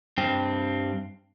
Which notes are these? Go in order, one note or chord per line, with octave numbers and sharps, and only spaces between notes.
G2 C4